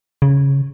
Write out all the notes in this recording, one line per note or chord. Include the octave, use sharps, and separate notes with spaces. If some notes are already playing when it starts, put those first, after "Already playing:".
C#3